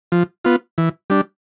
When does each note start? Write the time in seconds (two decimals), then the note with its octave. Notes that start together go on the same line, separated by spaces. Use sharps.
0.12 F3
0.45 B3 F4
0.78 E3
1.10 G3 D4